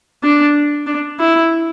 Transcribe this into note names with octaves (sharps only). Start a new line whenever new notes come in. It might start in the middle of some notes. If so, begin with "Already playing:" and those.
D4
D4
E4